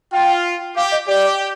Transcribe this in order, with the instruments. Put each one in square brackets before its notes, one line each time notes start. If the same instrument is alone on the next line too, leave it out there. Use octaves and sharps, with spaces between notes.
[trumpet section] F4 [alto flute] G5
[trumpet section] G4 [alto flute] F5
[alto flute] D#5
[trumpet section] G4 [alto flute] D5